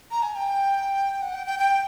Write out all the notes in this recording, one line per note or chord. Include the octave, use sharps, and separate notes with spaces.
A#5
G#5
G5
F#5
G5
G5
G5